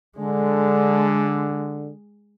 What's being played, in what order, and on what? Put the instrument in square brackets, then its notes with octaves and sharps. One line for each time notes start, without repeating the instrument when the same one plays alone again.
[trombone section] D3 [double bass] G#3